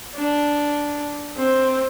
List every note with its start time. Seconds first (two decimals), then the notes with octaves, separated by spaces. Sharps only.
0.15 D4
1.36 C4